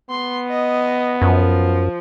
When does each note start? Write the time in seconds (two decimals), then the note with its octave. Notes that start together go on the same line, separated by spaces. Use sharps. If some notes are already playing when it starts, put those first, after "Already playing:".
0.10 B3 C6
0.49 D#5
1.22 F#2 F3